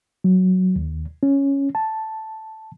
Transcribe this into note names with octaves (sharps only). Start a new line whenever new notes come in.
F#3
D#2
C#4
A5